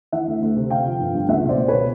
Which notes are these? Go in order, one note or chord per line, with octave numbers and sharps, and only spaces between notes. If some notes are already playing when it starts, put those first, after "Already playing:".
E3 E5 F#5
D2
D2
C3
D3 F5 G5
F3
G1
G2
C#2 E5 F#5
B2 C5 D5
C#2
B4 C#5
B2